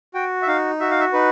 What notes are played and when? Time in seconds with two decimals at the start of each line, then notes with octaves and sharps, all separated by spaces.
0.14 F#4 G5
0.42 E5
0.47 D#4 F5
0.80 F#4 E5
0.90 F5
1.00 E5
1.13 D#4 B4